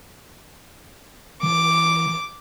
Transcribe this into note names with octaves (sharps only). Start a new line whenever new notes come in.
E3 D6